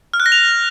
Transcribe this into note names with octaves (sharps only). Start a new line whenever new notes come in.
F6
F#6
A#6
F7